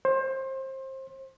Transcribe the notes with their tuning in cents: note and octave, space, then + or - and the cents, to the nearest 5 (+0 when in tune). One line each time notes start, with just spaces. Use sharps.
C5 +25